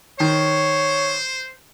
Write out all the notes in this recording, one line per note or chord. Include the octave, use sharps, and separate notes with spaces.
D#3 C5 C#5